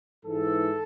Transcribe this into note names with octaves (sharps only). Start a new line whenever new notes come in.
G#2 E3 A4